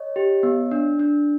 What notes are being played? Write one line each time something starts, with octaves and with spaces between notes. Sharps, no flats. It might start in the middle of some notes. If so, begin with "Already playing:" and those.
Already playing: C#5 D#5
G4
B3
D4
D4